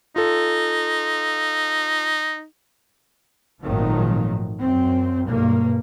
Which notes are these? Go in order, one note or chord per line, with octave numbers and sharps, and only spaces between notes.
D#4 F4 A4
G#1 A#2 D#3 F3 F#3 A3
F#2 C4
B1 G2 A#3